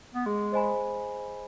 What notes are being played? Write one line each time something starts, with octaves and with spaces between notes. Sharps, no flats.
B3
G#3 G#4
C5 D#5 G#5 B5